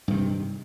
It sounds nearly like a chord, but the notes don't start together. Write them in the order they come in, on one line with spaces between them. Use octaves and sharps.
G2 D#3 C3